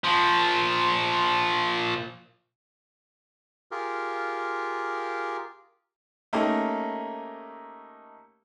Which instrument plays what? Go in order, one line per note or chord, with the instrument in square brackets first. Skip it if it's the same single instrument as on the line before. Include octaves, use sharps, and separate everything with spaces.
[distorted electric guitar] A#2 F3
[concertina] F4 G4 G#4 A#4
[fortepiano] A3 A#3 C#4 D#4 G4 A#4